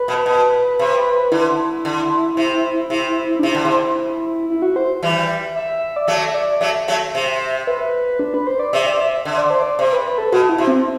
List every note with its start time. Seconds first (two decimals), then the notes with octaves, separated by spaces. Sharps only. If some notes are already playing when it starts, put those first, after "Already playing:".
Already playing: B4
0.08 B2
0.26 B2
0.79 C3
1.32 D3 E4
1.85 D3
2.37 C3
2.90 C3
3.39 D4
3.43 C3 E4
3.55 D3
3.65 C3
4.50 E4
4.62 F#4
4.76 C5
5.03 E3 G3
5.56 E5
5.96 D5
6.07 F#3 A3 E5
6.34 D5
6.61 F#3 A3 E5
6.88 F#3 A3
7.15 C3
7.67 B4
8.19 D4
8.34 B4
8.47 C5
8.60 D5
8.73 C3 E5
8.86 D5
8.99 E5
9.13 E5
9.25 D3 E5
9.38 D5
9.50 C5
9.62 D5
9.79 C3 C5
9.93 B4
10.06 B4
10.18 A4
10.32 B2 F#4
10.49 E4
10.58 C3
10.67 C4